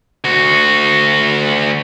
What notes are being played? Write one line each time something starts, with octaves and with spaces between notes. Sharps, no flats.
D2 F#4